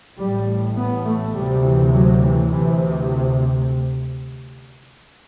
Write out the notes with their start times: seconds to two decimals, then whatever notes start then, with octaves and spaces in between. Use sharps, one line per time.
0.18 A1 A2 G3
0.77 B3
1.06 A3
1.35 D2 C3 G3
1.64 E3
1.94 F#3
2.23 E3
2.52 D2 C3 E3